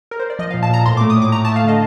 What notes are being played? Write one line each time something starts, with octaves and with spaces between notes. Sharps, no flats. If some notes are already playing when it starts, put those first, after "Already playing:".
A#4
C5
D5
F3 D#5
F5
A#2
A5
A#2 A#5
A2 C6
D6
A3
D#6
A2
D6
A3 A#5
A5
A3
F5
D3 D#5